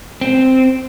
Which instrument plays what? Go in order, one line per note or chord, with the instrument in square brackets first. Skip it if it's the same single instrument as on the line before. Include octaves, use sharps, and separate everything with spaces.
[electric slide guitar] C4